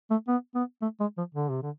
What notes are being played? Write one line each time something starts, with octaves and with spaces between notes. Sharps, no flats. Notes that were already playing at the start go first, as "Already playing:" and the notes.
A3
B3
B3
A3
G#3
F3
D3
C3
D3